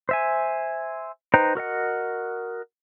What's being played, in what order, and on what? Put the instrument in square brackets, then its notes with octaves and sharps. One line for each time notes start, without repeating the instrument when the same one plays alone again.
[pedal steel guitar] C5 E5 G#5
D#4 B4 C5 G5 A#5
F#4 A#4 D#5 F#5